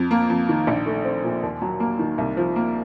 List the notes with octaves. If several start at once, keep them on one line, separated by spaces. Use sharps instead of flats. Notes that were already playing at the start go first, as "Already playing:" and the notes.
Already playing: F2
A#3
F2
D#3
A#1
A3
C4
A#2
D#2
F#3
A#3
D#3
C2
F3
A#3